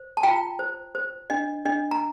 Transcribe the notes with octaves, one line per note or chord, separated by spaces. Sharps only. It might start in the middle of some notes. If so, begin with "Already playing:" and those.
Already playing: C5
A5
F4 G5 A#5
C5
C5
D4 D#5
D4 D#5
A#5